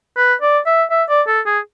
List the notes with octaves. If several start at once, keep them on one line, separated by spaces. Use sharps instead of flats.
B4
D5
E5
E5
D5
A4
G#4